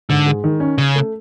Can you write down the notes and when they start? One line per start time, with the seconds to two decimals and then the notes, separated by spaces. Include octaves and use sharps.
0.10 G#2 D3
0.26 G#3
0.44 D#3
0.60 C#4
0.78 C#3 C#4
0.95 A3